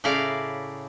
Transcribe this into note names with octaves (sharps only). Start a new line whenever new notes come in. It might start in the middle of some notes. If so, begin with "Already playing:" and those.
A2 C#3 E4 D5 F5 A#5